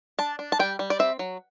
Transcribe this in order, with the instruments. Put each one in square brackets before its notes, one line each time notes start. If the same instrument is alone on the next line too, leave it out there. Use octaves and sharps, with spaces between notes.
[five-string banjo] D4 A5
D4
A5
G3 G5
G3
D5
C4 E5
F#3